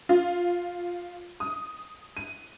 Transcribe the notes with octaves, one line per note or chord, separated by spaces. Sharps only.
F4
D#6
D#7